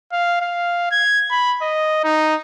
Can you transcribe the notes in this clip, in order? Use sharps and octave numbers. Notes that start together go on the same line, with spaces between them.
F5
F5
G#6
B5
D#5
D#4